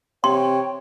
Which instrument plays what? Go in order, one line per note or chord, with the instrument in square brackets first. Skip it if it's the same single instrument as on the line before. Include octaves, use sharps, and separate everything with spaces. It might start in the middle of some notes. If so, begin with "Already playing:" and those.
[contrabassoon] C3 [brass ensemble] C#5 [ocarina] G5 [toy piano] C6